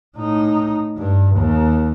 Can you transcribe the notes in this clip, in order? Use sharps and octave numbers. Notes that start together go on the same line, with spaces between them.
A2 D#4
G2
D#2